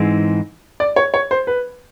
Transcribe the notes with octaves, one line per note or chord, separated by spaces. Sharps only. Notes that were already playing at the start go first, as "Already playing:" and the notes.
Already playing: G#2 E3 G#3 C4
D5
C#5
C#5
C5
B4